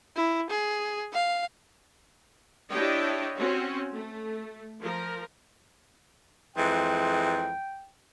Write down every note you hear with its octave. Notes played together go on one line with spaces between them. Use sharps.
E4
G#4
F5
D4 E4 G4 C#5 D#5 G5
C4 C#4 F#4
A3
F3 A#4
F2 E3 G#3 G5